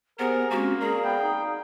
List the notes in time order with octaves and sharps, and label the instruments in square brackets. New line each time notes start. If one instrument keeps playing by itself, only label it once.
[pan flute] B3 [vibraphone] G4 C5 F#5 [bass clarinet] G#4 [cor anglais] A#4
[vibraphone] G#3 C4 C#4 [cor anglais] A#3 [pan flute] F#4
[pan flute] G#4 [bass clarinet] A#4 [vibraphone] D5 F5
[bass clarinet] B3 [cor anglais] G5
[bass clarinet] D#4